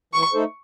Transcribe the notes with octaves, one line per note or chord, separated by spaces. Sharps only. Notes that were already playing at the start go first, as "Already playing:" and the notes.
E3 C#6
A3 D#4 A4 C5